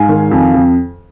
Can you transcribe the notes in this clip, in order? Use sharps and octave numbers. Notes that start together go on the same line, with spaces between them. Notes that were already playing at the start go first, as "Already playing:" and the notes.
Already playing: G#2 F5 G#5
D#3
F2
F2